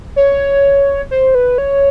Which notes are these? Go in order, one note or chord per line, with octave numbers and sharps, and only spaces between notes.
C#5
C5
B4
C#5